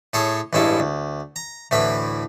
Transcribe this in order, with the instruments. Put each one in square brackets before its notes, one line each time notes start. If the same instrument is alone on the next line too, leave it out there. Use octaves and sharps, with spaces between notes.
[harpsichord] A2 G#4 A4 C#5 C6
A1 G2 G#3 C#4 E4 A4
D2
A#5
D2 A2 E3 B4 B5